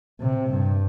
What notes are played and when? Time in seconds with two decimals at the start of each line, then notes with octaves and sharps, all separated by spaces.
0.21 C3
0.50 G2